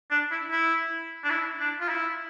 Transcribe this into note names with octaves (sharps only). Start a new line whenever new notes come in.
D4
E4
E4
D4
E4
D4
F4
E4